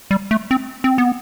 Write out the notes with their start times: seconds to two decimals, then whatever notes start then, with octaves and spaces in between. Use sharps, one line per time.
0.11 G3
0.31 A3
0.51 C4
0.84 C4
0.98 B3